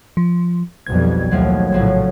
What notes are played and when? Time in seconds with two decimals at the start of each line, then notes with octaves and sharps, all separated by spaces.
0.17 F3
0.86 B1 F2 G3 G#6
1.31 D#2 A2 F3 F#3
1.72 A#1 A2 C#3 F3 F#3